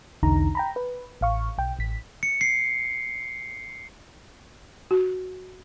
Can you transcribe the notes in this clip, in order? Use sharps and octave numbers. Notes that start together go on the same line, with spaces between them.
B1 E2 D3 D#4 A#5
G5 A#5 B5
B4
A1 F5 C#6
B1 G5
A1 B6
C#7
C7
F#4